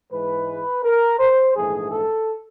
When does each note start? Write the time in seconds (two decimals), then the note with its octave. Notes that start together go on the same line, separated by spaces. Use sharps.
0.11 G#2 E3 G#3 B4
0.83 A#4
1.19 C5
1.55 A#1 G#2 E3 A3 G#4
1.91 A4